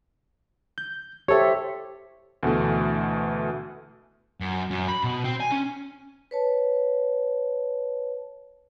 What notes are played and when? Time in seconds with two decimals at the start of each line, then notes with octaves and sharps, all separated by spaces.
0.78 G6
1.28 G4 A4 C5 C#5 E5
2.43 D2 B2 E3 A3
4.40 F#2
4.71 F#2
4.88 B5
5.03 B2
5.24 C4
5.40 G#5
5.52 C#4
6.31 B4 C#5 A5